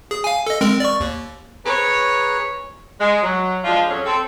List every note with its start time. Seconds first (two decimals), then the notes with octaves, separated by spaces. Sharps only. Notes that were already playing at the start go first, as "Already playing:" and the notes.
0.11 G#4
0.24 F5 G#5
0.47 A4 D#5
0.61 G#3 C4 A#4
0.80 D5 C#6
1.00 D#2
1.65 G#4 B4 C#5 A#5
3.01 G#3
3.23 F#3
3.64 F3 G#3 D4 F4
3.88 F2 F#3 C#4 G#4
4.05 C4 A4